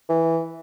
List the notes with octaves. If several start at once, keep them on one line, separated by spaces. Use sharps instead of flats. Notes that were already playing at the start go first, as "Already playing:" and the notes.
E3